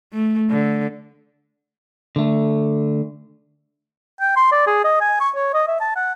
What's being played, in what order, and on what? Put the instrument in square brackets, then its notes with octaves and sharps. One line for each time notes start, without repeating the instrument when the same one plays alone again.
[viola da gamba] A3
D3
[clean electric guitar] D3 A3
[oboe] G5
C6
D5
G#4
D#5
G#5
C#6
C#5
D#5
E5
A5
F#5